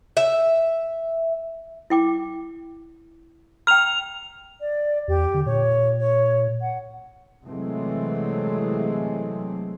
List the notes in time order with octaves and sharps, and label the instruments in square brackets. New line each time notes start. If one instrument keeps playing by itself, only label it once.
[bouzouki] E5
[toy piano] E4 G5 D6
[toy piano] G5 A#5 [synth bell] F6 F7
[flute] D5
[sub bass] E2 [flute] G4
[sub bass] D3
[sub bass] A#2 [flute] C#5
[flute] C#5
F#5
[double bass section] C3 E3 F#3 G#3 A3 C4